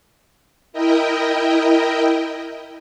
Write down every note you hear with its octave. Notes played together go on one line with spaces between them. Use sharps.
E4 A#4 D#5 G5